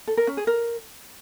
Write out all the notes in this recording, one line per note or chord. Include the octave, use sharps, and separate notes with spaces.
A4
A#4
C#4
G#4
A#4